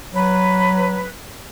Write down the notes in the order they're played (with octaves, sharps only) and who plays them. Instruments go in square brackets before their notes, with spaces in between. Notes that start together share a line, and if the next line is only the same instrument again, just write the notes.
[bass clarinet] F#3 [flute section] B4